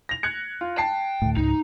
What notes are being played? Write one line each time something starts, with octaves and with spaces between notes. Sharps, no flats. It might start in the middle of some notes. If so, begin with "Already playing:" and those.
A#6 F7
F#6 G#6 C#7
F4
G5 A5 C7
D2 A2
C#2 G#2 D#4